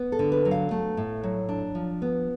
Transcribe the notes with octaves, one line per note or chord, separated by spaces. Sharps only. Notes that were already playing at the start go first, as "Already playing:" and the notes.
Already playing: B3
A4
D3
B4
F#3
F5
A3
A2
F#3
D4
F3
B3